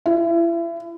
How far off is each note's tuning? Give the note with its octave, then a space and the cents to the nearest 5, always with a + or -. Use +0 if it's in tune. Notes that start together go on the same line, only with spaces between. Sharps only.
E4 +35